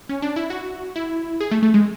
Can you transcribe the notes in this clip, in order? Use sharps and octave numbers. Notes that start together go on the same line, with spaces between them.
C#4
D4
E4
F#4
E4
G#4
A3
A3
G#3